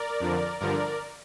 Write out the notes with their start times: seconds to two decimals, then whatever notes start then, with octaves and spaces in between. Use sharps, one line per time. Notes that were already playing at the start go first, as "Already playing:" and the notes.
Already playing: A#4 D5
0.20 F2 D3 F3
0.60 G2 D3 F3 A#4 D5